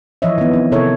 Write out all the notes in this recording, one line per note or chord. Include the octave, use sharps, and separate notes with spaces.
E3 F3 E4 C#5 D#5 E5
D#3 B3
C4
C3 E4 A4 A#4 C#5 E5